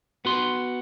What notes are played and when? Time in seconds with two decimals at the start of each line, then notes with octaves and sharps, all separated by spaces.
0.25 B3 F#4 C6